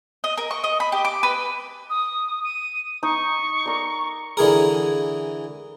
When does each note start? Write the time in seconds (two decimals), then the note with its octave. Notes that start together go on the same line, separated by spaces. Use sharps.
0.24 D#5
0.38 A#4
0.51 C#6
0.64 D#5
0.80 B5
0.92 G4
1.05 D6
1.23 B4
1.90 D#6
2.44 D#7
3.03 D#4 C#6
3.66 A#4 D5
4.37 D3 E3 G#4 A#4